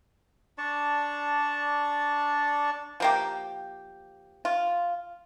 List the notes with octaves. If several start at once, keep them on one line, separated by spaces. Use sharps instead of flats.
D4 D5 A5 C#6
F3 A#3 G4
F4